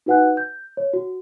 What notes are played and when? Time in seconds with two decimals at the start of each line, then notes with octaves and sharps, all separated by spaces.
0.06 D#4 F#4 B4 F#5 G#5 F#6
0.37 G6
0.77 C#5
0.93 F#4